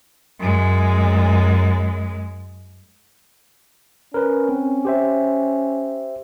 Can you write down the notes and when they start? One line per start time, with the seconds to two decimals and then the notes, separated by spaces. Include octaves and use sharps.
0.40 F#2 G#3
4.14 C#4 A#4 B4
4.49 C4
4.85 G4 C5 E5